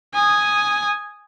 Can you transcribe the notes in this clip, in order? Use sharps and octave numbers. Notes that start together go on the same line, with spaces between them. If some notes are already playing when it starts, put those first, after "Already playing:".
G#5 D#6